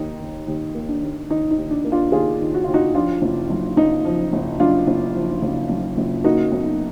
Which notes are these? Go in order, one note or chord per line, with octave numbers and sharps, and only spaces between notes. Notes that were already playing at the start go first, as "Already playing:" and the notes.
Already playing: D#2 A#3 D#4
D#3
D#2
A#3
D4
D#2
D#3 D#4
D#4
D#2
D4
A#3
D4 F4
D#2 F4 G#4
D#3
F#4
D#2 F4
D#4 F#4
F3 D4 F4
F#1
F#2
F#1 D#4
F3
F#1
F#2 D4 F4
F#1
F3
F#1
F#2
F#1
A#3 D#4 F#4
B1